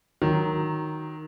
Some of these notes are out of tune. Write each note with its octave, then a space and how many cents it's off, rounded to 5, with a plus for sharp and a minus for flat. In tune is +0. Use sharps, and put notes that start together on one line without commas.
D#3 +0 F#3 +0